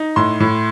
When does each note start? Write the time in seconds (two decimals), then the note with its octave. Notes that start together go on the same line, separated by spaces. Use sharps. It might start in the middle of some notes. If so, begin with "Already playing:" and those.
Already playing: D#4
0.16 A2 C6
0.40 A2